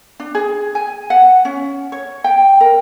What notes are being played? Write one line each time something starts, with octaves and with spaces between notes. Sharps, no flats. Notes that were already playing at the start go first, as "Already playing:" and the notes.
D4
G#4
G#5
F#5
C#4
C#5
G5
A#4